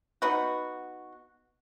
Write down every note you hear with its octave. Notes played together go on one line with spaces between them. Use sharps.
B3 D#4 F#4